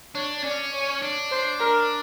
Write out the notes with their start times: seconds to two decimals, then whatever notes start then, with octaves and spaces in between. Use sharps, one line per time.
0.15 D4 C#5
0.44 C#4 D5
0.73 C#5
1.02 D4
1.31 C5
1.60 A#4